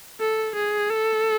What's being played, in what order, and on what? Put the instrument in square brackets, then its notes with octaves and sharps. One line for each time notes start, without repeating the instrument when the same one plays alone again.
[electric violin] A4
G#4
A4